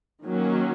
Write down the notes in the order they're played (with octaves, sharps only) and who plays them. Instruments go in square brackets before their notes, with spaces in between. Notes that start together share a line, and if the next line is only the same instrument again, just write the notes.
[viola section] D#3 F#3 A#3 C#4